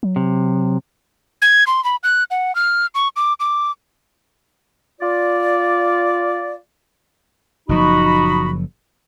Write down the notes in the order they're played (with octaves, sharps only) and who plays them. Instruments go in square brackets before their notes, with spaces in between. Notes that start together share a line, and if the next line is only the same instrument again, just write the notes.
[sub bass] F#3
[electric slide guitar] C3
[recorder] G#6
C6
B5
F#6
F#5
F6
C#6
D6
D6
[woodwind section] F4 D5
[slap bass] F#1 A#2 F3 [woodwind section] D#4 F#4 B5